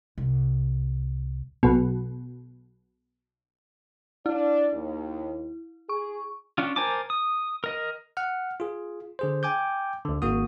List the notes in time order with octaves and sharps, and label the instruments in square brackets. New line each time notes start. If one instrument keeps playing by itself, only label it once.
[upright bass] C2
[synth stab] B1 B2
[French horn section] D4 D5 [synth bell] E4
[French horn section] D#2
[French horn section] G#4 [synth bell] C#6
[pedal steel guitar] C#4 D4 F4
A#4 C5 G#5 A5 D6
D#6
A#4 D#5
[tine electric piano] F#5 F6
F4 G#4
D3 G#4 C5
G5 G#5 D6 G6
D2 D3
G#1 A#3 F#4 D#6